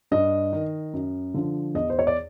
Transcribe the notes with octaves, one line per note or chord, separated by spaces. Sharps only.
G2 D#5
D#3
F#2
D3 F3
E2 D#5
C5
C#5
D5